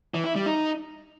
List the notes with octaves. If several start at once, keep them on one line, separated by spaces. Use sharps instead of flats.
E3
E4
G3
D#4